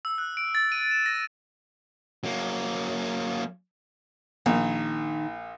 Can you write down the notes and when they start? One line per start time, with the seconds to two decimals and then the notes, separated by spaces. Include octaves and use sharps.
0.05 E6
0.18 F#6
0.37 D7
0.55 A6
0.72 D#7
0.91 E7
1.06 A#6
2.24 F#3 A#3
4.46 A#1 D#3